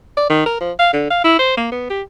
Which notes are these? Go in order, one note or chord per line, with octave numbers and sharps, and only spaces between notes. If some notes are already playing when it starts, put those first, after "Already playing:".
D5
D#3
A#4
F3
F5
D3
F5
E4
C5
A#3
B3
G4